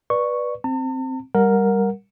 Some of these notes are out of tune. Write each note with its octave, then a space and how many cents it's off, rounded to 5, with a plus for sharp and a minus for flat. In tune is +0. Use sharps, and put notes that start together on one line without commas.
B4 -15 D5 +10 C#6 +0
C4 +0 A5 +45
G3 +5 A#4 +0 F#5 -20